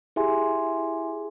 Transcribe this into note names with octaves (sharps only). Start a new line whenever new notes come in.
E4 G4 G#4 E5 G#5 C6